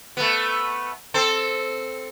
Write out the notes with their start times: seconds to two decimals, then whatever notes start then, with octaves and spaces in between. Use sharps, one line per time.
0.17 A3 B3
1.14 C4 A4 C5